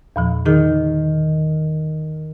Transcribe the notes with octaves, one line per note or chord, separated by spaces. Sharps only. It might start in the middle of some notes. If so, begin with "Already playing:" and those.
E2 A#2 F3
D#3 D#4 G#4